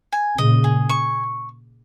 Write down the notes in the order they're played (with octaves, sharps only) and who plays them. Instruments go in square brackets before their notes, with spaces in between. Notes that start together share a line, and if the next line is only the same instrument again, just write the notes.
[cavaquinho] G#5
[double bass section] A#2 C#3 [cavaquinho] D#5
[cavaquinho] G#4
C#6